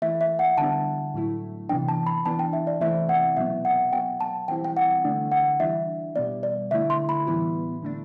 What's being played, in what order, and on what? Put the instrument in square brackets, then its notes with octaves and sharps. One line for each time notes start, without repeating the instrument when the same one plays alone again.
[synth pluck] E3 A3 E4 [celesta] E5
[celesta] E5
F#5
[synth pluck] D3 G3 B3 D4 [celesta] A5
[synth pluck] A2 F#3 A3 E4
[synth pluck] C3 E3 B3 D4 [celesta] G5
[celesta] A5
B5
[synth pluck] E3 B3 D4 [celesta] A5
[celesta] G5
E5
D5
[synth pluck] C3 E3 A3 C4 E4 [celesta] E5
[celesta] F#5
[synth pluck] B2 F#3 B3 [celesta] E5
[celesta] F#5
[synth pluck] B2 F#3 B3 [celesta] G5
[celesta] A5
[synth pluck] E3 G3 C4 E4 [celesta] G5
[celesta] G5
F#5
[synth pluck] D3 A3 D4
[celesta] F#5
[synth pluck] E3 G3 D4 [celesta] E5
[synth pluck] B2 G3 B3 [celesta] D5
[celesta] D5
[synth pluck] D3 A3 E4 [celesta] E5
[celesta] C6
B5
[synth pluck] A2 E3 G3 B3 E4
D3 A3 D4